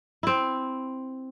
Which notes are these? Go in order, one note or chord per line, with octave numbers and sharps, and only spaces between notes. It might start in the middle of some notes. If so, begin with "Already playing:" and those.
C4 E4